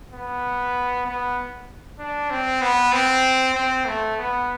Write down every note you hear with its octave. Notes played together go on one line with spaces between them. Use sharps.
B3
B3
D4
C4
B3
C4
C4
A3
B3